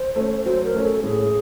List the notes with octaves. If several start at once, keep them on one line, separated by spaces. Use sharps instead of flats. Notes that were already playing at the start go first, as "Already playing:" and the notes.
Already playing: C5
A3 C#4
F#3 C5
A#4
A3 C#4
A4
A2 G#4